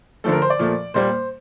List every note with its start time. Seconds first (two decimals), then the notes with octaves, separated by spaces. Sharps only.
0.24 D3 F3 A3 A4
0.33 A#4
0.42 C5
0.50 D5
0.59 A#2 F3 A3
0.94 A#2 G3 A#3 C5